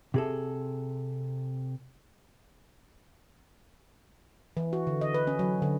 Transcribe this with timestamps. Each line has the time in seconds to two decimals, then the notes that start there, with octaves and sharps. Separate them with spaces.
0.14 C3 G#4 A4
4.57 E3
4.73 F#4
4.87 D3
5.01 D#5
5.14 B4
5.27 C#4
5.39 F#3
5.62 D3